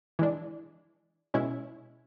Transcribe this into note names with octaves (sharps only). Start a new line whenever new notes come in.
E3 G#3 D4
B2 G#3 C#4 E4